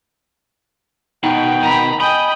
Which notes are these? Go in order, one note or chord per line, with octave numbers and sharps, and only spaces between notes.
B2 D#3 G5
D#3 G#5 A#5 B5
D#5 G5 G#5 A#5 B5